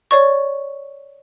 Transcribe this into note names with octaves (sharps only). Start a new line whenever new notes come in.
C#5 D5 C#6